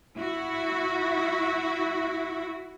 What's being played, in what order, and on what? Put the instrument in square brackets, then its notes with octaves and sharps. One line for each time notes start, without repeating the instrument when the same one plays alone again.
[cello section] E4 F#4